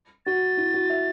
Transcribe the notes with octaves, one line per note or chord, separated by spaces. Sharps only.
F#4 A6
E4
F#4
E5